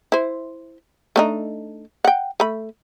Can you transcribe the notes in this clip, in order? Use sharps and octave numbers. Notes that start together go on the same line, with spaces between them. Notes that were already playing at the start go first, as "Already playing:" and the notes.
E4 C5
A3 D4 D#4
F#5 G5
A3 B5